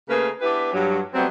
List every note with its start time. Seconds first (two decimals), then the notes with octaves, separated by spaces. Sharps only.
0.09 C#3 A3 A#3 G#4 A#4 B4
0.42 B3 D4 E4 G4 B4
0.73 G2 F#3
1.15 F#3 G3 A3 B3 C4